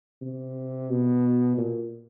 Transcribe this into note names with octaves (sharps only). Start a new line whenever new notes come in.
C3
B2
A#2